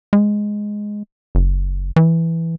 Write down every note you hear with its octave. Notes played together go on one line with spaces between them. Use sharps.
G#3
F#1
E3